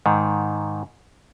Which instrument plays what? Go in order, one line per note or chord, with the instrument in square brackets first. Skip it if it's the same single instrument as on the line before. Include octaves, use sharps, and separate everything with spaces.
[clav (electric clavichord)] G#2 D#3